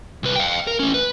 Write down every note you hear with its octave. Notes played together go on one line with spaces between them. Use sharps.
C2 B4
F5 G5
A#4
A3 C#4
B4